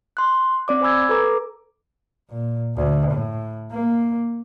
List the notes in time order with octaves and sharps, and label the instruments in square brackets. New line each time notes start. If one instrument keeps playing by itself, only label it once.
[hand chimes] C6 F#6
C4 D5 D6
C5 G#5 B5 E6 G#6
A4 B4 A#5 D6
[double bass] A#2
D2
A2
A#3